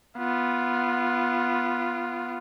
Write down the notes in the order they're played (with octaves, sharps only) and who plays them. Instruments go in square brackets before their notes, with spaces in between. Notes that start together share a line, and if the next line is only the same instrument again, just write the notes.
[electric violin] B3 F4